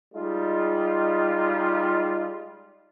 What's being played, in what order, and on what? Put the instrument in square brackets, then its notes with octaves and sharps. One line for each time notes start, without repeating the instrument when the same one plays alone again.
[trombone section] G3 G#3 D#4 F4